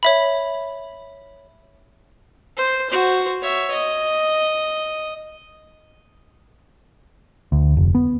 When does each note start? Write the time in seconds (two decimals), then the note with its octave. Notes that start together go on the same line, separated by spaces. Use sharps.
0.03 C#5 E5 B5
2.57 C5
2.90 F#4 C5
3.42 C#5 E5
3.72 D#5
7.52 D2
7.77 F1
7.95 B3